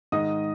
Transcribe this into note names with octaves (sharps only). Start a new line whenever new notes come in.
G#2 D#3 D#5 D#6